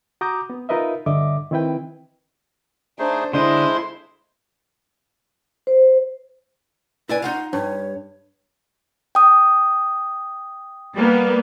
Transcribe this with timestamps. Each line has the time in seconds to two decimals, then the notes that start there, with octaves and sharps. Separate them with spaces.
0.21 F#4 A#5 D6 D#6 G6
0.50 B3
0.69 D#4 F4 A#4 B4 D#5 E5
1.06 G2 D3 D#5 E5 D6
1.51 D#3 C4 E4 B4 G5
2.99 A3 D4 D#4 G#4 C5
3.33 D3 G#3 D4 E4 A4 C5 D#5 C6
5.67 C5
7.09 E4 B4 D5 G#5
7.22 D#4 F4 F5 F#5
7.53 G2 C#5
9.15 G5 D#6
10.94 G3 A#3 B3